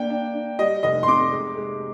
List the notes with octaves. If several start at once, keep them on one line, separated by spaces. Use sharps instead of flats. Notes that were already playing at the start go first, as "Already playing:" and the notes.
Already playing: A#3 D4 G5
D4
D4
G3 D#5
F1 D#5
C6
C3 D6
G#3
G#3